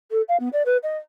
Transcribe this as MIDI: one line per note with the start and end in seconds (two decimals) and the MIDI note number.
0.12 0.22 69
0.29 0.37 77
0.40 0.49 59
0.53 0.62 74
0.66 0.77 71
0.83 0.97 75